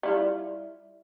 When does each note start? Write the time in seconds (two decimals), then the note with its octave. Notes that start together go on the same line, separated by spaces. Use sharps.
0.03 G3 E4 F4